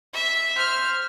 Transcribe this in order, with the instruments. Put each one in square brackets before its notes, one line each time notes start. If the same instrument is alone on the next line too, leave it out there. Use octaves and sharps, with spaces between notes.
[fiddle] E5
[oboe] C5 [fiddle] F6